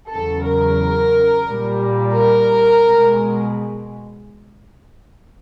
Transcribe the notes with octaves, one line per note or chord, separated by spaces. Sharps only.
E2 C#3 F#3 A4
A#4
A#2 G3
A#4
B2 G#3